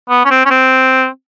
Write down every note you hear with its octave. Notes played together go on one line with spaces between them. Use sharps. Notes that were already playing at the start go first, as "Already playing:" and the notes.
B3
C#4
C4
C#4
C4